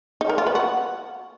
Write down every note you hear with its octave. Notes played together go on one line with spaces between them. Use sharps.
D#4
A#4
F4
B4
F#4